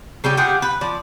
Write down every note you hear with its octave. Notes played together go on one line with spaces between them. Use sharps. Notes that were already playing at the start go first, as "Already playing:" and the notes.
C#3 G3 C#4 G4
F4 G4 G#4 F#5
B4
F3 D5